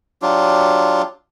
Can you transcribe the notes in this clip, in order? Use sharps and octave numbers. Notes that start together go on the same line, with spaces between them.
F#3 D4 F4 G4